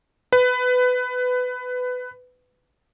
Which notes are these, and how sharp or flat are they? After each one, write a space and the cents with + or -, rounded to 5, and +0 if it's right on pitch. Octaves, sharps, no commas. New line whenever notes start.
B4 +20